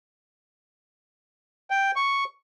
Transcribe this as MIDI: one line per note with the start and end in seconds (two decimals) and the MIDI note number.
1.70 1.91 79
1.96 2.24 85